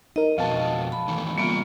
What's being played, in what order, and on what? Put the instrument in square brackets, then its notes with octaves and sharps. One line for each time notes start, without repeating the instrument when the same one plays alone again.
[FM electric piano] D#4 A#4 [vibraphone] D#5
[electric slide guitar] F2 B2 B3 [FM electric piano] F5 A5
[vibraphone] B5
[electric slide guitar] D#3 E3 A3
[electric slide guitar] C#3 G3 E5 [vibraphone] A#3 B3 F4